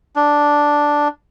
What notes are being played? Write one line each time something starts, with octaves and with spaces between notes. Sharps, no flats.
D4